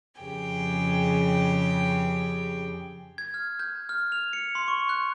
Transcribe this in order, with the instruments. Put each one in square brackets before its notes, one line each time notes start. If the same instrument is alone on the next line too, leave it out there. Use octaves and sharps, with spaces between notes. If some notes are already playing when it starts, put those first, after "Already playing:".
[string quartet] F2 C#3 G4 G#4 G5
[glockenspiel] G#6
F6
G6
F6
F7
C#7
C6
C#6
F#6